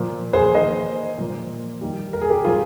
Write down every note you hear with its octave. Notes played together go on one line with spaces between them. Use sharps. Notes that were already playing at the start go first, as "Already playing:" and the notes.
Already playing: A#2 F3 A#3
G#4 C5
D#3 A#3 C5 D#5
A#2 F3 A#3
D#3 G3 A#3
A#4
G#4
G4 A#4
A#2 F3 A#3 F4 G#4